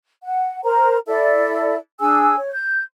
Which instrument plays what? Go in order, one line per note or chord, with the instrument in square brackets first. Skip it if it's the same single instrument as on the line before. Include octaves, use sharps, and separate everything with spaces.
[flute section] F#5
A#4 C5 A#5
E4 A4 D5 E5
D4 G#4 G#5 E6
C#5
G6